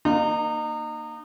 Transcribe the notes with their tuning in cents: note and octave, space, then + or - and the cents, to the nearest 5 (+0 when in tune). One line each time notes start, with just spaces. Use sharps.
A#3 +0 D#4 -30